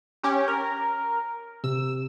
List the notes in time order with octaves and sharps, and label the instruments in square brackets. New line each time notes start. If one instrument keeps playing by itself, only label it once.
[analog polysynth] C#4 G4
A#4
[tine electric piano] C3 [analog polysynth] E6